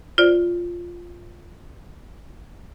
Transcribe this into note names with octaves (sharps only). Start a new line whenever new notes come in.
F4 C5 D5